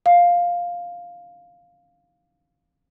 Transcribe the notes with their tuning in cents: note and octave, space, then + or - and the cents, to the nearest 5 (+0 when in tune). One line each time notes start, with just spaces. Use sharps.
F5 +5